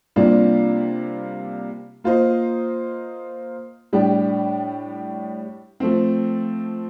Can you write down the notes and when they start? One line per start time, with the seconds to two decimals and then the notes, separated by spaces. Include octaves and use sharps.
0.16 C3 G3 A#3 D4 F4
2.04 A#3 F4 C5 D#5
3.93 A2 G3 D4 G4
5.80 F3 A3 C4